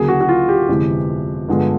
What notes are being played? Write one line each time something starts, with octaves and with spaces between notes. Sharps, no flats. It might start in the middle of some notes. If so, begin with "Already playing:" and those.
Already playing: D2 C#3 F#3 A#3 G#4
F#4
F#4
F4
G4
G1 F2 C3 E3 G#3
G2 D3 F3 G#3 B3